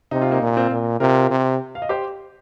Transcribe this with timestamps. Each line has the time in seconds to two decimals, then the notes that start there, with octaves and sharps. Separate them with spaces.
0.11 C3 D#4
0.21 F4
0.31 A#3 D#4
0.42 A#2
0.57 C4 F4
0.71 A#2
1.00 C3 F4 A#4
1.30 C3
1.75 F5
1.82 D#5
1.89 G4 C5